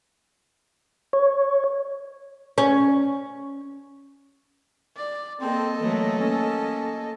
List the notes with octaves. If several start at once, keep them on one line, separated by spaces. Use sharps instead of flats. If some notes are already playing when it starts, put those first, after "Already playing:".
C#5
C#4
D5
A#3 C4 A4 D#5
E3 F#3 A3 A#3
A#3 C#4